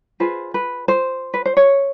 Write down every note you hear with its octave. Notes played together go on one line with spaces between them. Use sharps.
F4 G#4 B4 C5
B4
C5
B4
C5
C#5